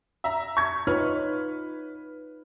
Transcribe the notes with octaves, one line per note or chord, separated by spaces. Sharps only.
E5 A#5
C#6 G#6
D#4 F4 B4 C#5 F6